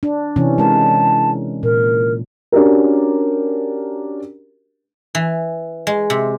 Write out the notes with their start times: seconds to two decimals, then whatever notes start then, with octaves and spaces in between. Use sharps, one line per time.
0.03 D4
0.36 C3 E3 C#4
0.58 G#3 A#4 A5
1.63 A#2 A#4
2.52 C#4 D4 F#4 G4 A#4
5.15 E3
5.87 G#3
6.10 C3